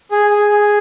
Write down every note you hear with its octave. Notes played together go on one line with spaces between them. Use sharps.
G#4
G#4
G#4